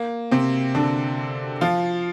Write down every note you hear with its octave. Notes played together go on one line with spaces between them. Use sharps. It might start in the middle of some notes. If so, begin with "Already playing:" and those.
Already playing: A#3
C3 C4
D3 D4
F3 F4